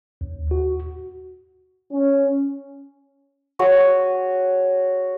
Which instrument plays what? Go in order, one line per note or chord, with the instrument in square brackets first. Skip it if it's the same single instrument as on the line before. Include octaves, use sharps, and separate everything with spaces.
[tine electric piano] D#2
F#4
[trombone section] C#4
[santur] F#4 G#4 C#5 E6